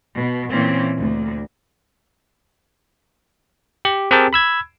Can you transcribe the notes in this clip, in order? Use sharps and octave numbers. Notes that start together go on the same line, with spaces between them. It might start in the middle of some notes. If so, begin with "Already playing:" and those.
B2
A#2 E3 C4 C#4
D2
G4
C4 G4 G#4 A#4 G5 A5
B5 E6 G#6